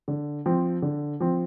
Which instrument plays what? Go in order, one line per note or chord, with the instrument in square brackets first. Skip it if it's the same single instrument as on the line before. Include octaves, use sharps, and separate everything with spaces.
[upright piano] D3
F3 C4
D3
F3 C4